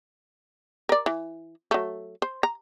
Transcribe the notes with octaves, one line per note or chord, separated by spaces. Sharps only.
A#4 D5
E3
F#3 A3
C5
A#5